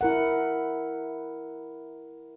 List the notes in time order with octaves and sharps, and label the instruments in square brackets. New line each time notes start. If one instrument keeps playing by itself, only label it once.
[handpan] E4 A#4 F#5